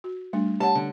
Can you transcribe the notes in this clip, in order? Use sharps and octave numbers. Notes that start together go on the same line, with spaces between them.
F#4
G3 A3 D4
G4 C#5 F#5 A5
D3